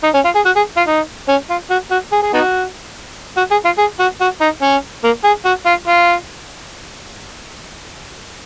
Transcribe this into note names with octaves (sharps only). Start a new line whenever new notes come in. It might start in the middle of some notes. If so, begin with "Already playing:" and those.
D#4
C#4
F4
G#4
F#4
G#4
F4
D#4
C#4
F4
F#4
F#4
G#4
G#4
B3 D#4 F#4
F#4
G#4
F4
G#4
F#4
F#4
D#4
C#4
A#3
G#4
F#4
F4
F4